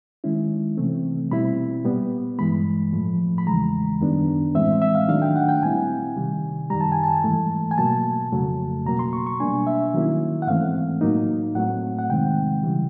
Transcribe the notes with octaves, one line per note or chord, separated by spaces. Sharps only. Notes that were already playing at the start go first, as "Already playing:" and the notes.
D#3 G#3 C#4 E4
C3 E3 A3 C4
B2 G3 C4 E4 B5
A#2 G3 B3
G2 E3 G#3 B5
A2 F3 A3
B5
E2 C#3 E3 G#3 A#5
F#2 D#3 G3 B3 D4
A2 E3 G#3 C4 E5
E5
F5
D#3 F#3 A3 D4 F5
G5
F#5
G5
A#2 G3 C4 E4 G#5
C3 D#3 G3
F#2 D#3 G3 A#5
A5
G#5
A5
G#2 E3 A3
G#5
B2 F#3 A#3 A5
F2 C#3 F#3 A3
B2 F#3 A#3 A#5
C6
C#6
C#6
B2 G3 A#3 D4 G#5
E5
D#3 F#3 A#3 C#4 E4
F#5
G#2 E3 A3 C4 F5
A2 F#3 A#3 D#4
A2 F#3 A3 C4 F#5
F#5
C3 D#3 G#3 C4 G5
C#3 E3 G3